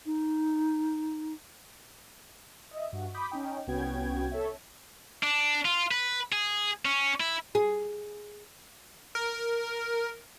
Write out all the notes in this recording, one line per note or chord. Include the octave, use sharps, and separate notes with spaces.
D#4
D#5 E5
G2 F#4
B5 D6 D#6 G6 B6
C#4 D#4 G5
C2 B3 C#4 F#4 G5 G#6
A4 C#5 E5
D4
F4
B4
G#4
C#4
E4
G#4
A#4